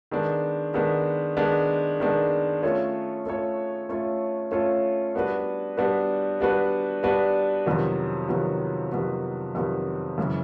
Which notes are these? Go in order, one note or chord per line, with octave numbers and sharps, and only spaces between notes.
D#3 G#3 B3 D4
D#3 G#3 B3 D4
D#3 G#3 B3 D4
D#3 G#3 B3 D4
A3 C#4 F4 A4 C#5
A3 C#4 F4 A4 C#5
A3 C#4 F4 A4 C#5
A3 C#4 F4 A4 C#5
G3 B3 D4 F#4 B4
G3 B3 D4 F#4 B4
G3 B3 D4 F#4 B4
G3 B3 D4 F#4 B4
F2 C3 D#3 F#3 B3
F2 C3 D#3 F#3 B3
F2 C3 D#3 F#3 B3
F2 C3 D#3 F#3 B3
F#2 C#3 E3